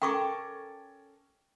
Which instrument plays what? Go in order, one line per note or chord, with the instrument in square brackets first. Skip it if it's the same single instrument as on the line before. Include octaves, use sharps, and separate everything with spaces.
[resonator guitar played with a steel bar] C#4 A4 A#4 [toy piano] G5 C#6 D6